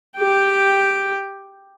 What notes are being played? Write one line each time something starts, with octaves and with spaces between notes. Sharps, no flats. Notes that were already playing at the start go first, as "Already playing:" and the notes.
G4 G5